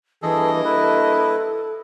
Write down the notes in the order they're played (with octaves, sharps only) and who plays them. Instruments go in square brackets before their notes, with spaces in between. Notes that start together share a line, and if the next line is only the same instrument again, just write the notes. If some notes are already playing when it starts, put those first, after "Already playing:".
[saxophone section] G2 A#3 D#5 [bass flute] E3 [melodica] G#4 A4
[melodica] E4 B4 [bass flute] A4